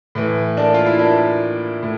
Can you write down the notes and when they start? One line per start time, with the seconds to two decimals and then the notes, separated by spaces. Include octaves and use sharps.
0.15 A2 E3
0.57 A#3 D4
0.74 F4
0.86 E4
0.99 A#3 D4
1.83 A2